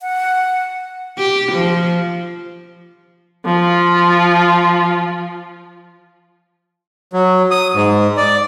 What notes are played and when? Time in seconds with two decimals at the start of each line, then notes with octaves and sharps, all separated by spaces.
0.01 F#5
1.18 G4
1.52 F3
3.45 F3 F4
7.13 F#3
7.51 D#6
7.75 G#2
8.18 D5